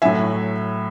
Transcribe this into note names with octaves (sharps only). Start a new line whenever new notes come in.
A2 F#3 E5 G#5